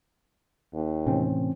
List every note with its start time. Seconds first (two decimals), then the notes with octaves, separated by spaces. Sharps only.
0.74 D#2
1.06 A2 C3 E3 C4 C#4